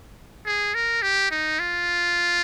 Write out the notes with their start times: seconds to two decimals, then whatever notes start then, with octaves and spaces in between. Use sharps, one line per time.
0.46 G#4
0.74 A#4
1.02 G4
1.31 D#4
1.59 F4